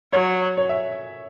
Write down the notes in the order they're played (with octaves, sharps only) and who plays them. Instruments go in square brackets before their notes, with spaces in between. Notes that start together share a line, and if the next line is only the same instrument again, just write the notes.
[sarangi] F#3 [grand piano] C#5
[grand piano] C#5
E5